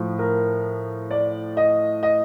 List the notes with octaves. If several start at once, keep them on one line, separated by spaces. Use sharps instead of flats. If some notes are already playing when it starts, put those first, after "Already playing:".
Already playing: A2 F3
A#4
D5
D#5
D#5